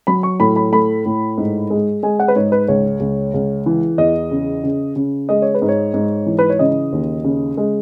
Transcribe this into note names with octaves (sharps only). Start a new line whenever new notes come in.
F#3 B5
C#6
A2 B5
B5
A3 B5
A2
G#2
G#3
G#3 G#5
F#5
B4
G#2 C#5
B4
C#2 C#5
C#2
C#2
E3
E2 D#5
C#3
C#3
C#3
G#3 D#5
C#5
B4
G#2
C#5
G#2
E3
B4
C#5
C#3 D#5
D#2
C#3
G#3